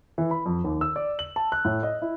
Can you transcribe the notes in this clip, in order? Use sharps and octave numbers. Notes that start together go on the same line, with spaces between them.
E3
B5
F2
D#2
E6
D5
F#7
A5
F#6
A2
D#5
E4